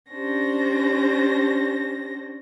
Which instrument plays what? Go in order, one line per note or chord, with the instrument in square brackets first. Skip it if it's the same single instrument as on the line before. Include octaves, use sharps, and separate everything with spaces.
[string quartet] C#4 D4 G4 C5 A#6